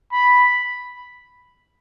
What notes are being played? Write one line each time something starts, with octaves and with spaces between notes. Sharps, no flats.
B5